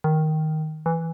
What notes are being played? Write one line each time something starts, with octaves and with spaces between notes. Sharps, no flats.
D#3
E3